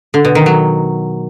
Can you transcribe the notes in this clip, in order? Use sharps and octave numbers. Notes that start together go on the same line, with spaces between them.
D3
B2
D#3
F#3